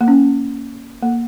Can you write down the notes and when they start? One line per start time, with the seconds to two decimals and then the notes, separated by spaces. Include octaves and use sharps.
0.01 A#3
0.08 C#4
1.02 A#3